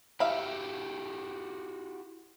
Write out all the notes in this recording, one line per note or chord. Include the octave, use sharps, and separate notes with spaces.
E4 F#4 G4 E5 F5 B5